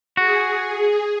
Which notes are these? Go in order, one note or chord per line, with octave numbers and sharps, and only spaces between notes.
F#4 G#4